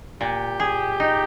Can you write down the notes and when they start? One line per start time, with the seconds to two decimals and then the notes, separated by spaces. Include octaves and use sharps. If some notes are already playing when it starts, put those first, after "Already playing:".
0.21 A#2 G4
0.60 G#4
1.00 D#4